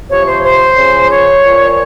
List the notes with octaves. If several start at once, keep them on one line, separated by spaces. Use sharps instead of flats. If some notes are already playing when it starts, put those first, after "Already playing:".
C3 F3 C#5
C5
C5
C#3 F3
C#5
A#2 F3